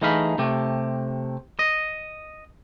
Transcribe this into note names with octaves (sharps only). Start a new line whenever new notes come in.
E3 A3 D#4 G#4 F5 B5
C3 A3 G4
D#5